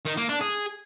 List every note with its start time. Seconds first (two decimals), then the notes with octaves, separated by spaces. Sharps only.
0.05 D#3
0.17 A#3
0.29 D4
0.41 G#4